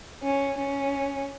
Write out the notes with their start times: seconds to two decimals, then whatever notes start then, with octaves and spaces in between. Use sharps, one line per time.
0.24 C#4
0.58 C#4